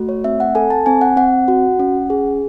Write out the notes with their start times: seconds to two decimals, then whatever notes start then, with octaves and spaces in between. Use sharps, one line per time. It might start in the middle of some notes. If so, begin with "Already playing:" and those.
Already playing: A3 F#4
0.09 C#5
0.24 C4 E5
0.40 F#5
0.55 A4 G#5
0.70 A5
0.86 C4 G#5
1.01 F#5
1.17 C4 F#5
1.48 F#4
1.79 C#4
2.10 G#4